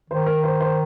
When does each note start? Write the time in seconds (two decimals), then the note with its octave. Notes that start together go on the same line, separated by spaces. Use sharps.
0.10 D#3 C5
0.26 A#4
0.44 C5
0.60 C5